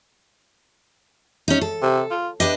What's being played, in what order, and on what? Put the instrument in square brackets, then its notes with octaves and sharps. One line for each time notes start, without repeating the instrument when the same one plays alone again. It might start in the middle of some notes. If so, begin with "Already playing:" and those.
[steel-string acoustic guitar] C#4 D#4
A4
[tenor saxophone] C3
F4
[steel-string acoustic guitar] D4 B4 D#5 [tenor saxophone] G4